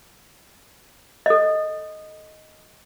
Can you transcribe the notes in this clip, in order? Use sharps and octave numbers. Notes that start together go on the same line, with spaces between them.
A4 D#5